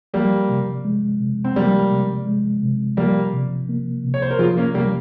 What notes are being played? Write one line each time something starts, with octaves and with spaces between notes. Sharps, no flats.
F3 G3 A#3
C3
G#3
C3
C4
F3 G3 A#3
C3
G#3
C3
F3 G3 A#3
C3
A#3
C3
C#5
C5
A#4
F3 F4 G#4
A#3 C#4
C3 G3 A#3